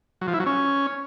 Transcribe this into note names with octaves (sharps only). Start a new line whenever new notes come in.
F#3
F3
E4
F#3
C#4